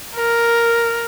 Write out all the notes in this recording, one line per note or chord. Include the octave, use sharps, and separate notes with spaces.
A#4